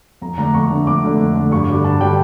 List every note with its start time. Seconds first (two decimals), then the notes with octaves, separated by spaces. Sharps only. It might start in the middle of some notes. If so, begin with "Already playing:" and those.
0.22 F2 A#5
0.37 D3 A3 D4 A#5
0.54 F2 C#6
0.71 D3 A3 D4
0.87 F2 D6
1.03 D3 A3 D4
1.19 F2
1.35 D3 A3 D4
1.51 G2 C#6
1.68 D3 G3 D4
1.84 G2 A5
2.00 D3 G3 D4 G5